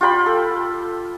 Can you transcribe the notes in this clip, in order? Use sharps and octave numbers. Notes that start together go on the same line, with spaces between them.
F4 G4 G5 B5
A4